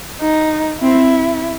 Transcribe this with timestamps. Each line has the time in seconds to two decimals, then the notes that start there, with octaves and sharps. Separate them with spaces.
0.21 D#4
0.81 C4 E4